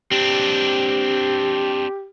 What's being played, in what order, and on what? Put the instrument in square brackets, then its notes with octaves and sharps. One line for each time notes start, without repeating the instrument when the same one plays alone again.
[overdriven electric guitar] C4 D4 [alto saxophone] G4